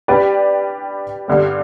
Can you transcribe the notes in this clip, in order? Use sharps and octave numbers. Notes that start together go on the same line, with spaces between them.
G3 D4 G4 B4 D5
G2 D3 G3